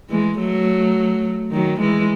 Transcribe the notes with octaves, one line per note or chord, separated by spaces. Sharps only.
E3 G#3
F#3 A3
D#3 F#3
E3 G#3